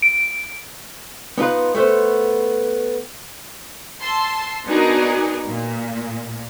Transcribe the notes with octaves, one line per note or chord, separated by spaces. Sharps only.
D7
B3 D#4 F4 B4
A3 B3 C5
A5 C6 E6
B3 D4 D#4 F#4 G#4 A#4
A#2